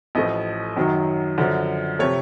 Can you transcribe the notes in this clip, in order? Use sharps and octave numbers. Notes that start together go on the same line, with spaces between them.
A1 A2 F3 A3 D#5
F#2 D#3 F#3
F#2 D3 F3
C3 F3 A3 C#5